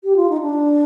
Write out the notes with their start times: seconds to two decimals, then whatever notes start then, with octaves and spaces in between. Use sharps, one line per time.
0.04 G4
0.16 F4
0.30 D#4
0.41 D4